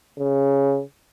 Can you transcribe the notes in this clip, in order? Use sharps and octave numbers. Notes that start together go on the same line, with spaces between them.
C#3